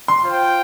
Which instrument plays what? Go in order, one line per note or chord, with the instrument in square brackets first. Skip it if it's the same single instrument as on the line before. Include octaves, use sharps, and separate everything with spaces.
[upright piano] C6
[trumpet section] F4 C5 G5